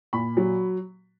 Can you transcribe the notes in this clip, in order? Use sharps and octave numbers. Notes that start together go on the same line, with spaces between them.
A#2 B5
F#3